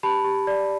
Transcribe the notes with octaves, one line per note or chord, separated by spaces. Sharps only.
G4 A5 B5
G4
D5